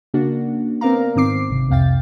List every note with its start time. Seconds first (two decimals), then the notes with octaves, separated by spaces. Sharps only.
0.14 C#3 A#3 D4 F#4
0.81 B3 C4 A#4 D5 F5 A#5
1.16 G#2 D#3 C4 D6 C7
1.49 G1 C3
1.69 C2 F2 C3 F5 G5 A6